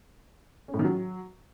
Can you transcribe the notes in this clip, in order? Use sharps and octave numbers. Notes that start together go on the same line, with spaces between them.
C#4
A2
D#3
F#3